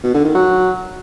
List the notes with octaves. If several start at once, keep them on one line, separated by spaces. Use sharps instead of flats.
B2
D3
D#3
F#3